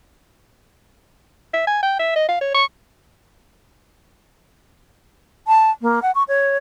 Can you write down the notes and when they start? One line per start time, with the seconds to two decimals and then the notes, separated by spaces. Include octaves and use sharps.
1.54 E5
1.67 G#5
1.83 G5
1.99 E5
2.16 D#5
2.29 F5
2.41 C#5
2.55 C#6
5.47 A5
5.82 A#3
6.02 F#5
6.15 C#6
6.28 C#5